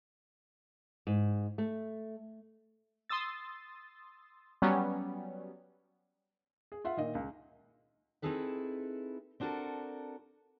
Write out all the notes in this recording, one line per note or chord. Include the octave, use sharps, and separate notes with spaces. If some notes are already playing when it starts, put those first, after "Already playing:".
G#2
A3
C6 D#6 E6 A6
F#3 G3 B3 C#4
G#4
F4 E5 F#5
A#2 D#3 D#5
C#2
C4 D#4 E4 G#4 A4 B4
C4 D4 F#4 A4 A#4